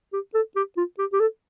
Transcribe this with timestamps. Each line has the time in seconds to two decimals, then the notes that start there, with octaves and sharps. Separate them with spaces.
0.13 G4
0.35 A4
0.56 G4
0.77 F4
0.99 G4
1.13 G4
1.20 A4